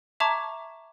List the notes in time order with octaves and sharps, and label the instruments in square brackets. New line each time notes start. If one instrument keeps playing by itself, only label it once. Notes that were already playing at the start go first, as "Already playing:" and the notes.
[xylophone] E5 A5 A#5 C#6 D6 G#6